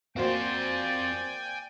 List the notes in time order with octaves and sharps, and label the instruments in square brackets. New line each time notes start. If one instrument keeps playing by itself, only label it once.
[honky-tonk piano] A#3 F#4 C5 [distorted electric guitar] C4 F4 [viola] D5 [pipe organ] G5 G#5